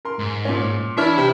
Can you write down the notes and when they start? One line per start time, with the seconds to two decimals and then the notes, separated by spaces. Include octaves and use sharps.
0.05 A#4 C6
0.19 G#2
0.45 A#2 C#4
0.97 E3 D4 C#5 E5 B5 F6
1.17 C3